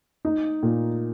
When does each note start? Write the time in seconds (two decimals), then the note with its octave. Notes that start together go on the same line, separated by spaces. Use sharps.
0.25 D#4
0.63 A#2